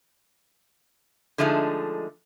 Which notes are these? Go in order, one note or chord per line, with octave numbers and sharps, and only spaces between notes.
D3 F3 G#3 A3 D#4